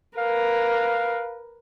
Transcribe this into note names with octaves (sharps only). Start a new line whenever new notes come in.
A#4 B4 F5